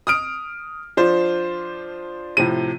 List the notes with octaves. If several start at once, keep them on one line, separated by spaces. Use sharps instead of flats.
D#6 F6 D7
F3 D4 F4 C5
A2 C3 F3 D#7